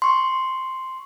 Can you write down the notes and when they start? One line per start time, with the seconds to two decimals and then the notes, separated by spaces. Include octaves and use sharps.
0.02 C6 C#6